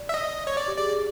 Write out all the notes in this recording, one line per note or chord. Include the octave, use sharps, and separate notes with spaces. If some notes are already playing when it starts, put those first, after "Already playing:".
Already playing: D5
E5
D#5
C#5
D5
G4
G#4 D5
G#4